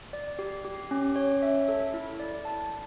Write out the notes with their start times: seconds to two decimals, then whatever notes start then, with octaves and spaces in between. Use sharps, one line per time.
0.13 D5
0.39 G4
0.65 G4
0.91 C#4
1.16 C#5
1.42 E5
1.68 A4
1.94 E4
2.20 D5
2.45 A5